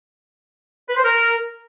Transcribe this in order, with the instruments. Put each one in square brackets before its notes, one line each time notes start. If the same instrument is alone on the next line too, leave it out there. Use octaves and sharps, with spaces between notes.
[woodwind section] B4
C5
A#4